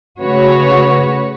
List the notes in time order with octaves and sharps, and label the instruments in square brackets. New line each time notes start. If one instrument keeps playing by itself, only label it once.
[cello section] C#3 A3 F#4 B4 C#5